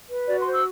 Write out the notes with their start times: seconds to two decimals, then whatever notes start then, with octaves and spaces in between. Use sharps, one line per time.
0.09 B4
0.27 F#4 D5
0.40 C6
0.46 C5
0.53 E6